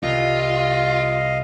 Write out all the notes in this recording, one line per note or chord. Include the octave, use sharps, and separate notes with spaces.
C2 F4 D#5 F5